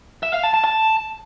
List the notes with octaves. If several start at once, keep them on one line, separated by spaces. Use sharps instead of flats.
E5
F5
A5
A5
A5